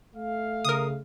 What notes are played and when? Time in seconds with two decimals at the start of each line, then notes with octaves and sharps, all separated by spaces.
0.16 A3 F5
0.65 C#3 A#4 D#6